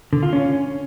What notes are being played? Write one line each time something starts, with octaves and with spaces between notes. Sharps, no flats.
D3
F4
C#4